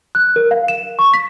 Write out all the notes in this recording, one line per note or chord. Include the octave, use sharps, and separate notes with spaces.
F#6
A#4
F5
E7
C#6
B6